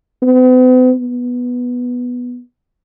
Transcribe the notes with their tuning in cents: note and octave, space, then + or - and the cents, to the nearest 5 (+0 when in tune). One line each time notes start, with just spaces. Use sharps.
B3 +45
B3 -5